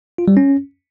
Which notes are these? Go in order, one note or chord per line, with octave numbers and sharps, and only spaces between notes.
F4
G3
C#4